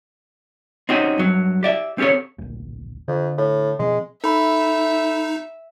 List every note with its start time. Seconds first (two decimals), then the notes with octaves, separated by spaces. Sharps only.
0.89 C4 C#4 D#4 F#4 G4
1.18 G2 F#3
1.63 G4 D5 E5
1.98 C4 C#4 G4 A4 C#5
2.38 D1 A#1
3.08 F2 D3
3.38 A2
3.79 B2 F3 G#3 C4
4.24 D#4 A4 E5 B5